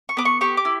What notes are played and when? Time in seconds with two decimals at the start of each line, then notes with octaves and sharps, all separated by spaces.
0.09 C#6
0.17 B3 D6
0.25 C#6
0.41 G4 C#6
0.57 D6
0.65 E4